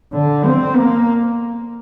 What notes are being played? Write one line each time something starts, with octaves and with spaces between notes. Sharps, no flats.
D3
C4
A#3